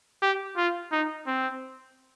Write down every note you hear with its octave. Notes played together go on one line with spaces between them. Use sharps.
G4
F4
D#4
C4